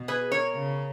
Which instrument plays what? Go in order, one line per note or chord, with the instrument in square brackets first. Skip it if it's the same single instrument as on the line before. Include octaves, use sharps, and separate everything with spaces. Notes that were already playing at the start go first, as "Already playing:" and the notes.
Already playing: [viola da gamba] B2
[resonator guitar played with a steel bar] G#4 B4
A#4 C#5
[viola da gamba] C#3